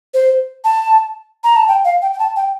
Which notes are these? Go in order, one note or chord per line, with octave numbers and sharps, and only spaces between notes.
C5
A5
A#5
A5
G5
F5
G5
G5
A5
G5